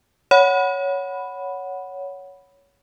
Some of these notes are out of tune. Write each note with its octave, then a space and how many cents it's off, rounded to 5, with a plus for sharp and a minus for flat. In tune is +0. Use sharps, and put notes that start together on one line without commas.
C#5 +10 F#5 +0 B5 +0